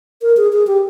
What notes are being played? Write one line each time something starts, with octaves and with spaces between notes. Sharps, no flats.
A#4
G#4
G#4
G4